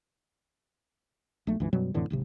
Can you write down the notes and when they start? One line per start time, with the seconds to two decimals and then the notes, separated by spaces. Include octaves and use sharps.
1.47 A#1 A3
1.60 C#2 G2 E3
1.73 F#2 B2 F#3 G3
1.94 F2 A2 D3 E3
2.10 D1 G#1 C3